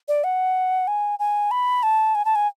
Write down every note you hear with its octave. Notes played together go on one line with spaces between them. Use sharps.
D5
F#5
G#5
G#5
B5
A5
G#5
A5
G#5